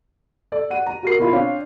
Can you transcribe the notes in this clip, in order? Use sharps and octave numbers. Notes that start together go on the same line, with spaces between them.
A4 D5
F#5 D#7
A#5
F#4 A#4 C7
B2 E4 F4 B5
C4 D4 C#5 F5